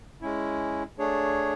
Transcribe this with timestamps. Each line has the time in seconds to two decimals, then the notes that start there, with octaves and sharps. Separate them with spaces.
0.22 G#3 C#4 E4
0.99 A3 D4 G#4 C#5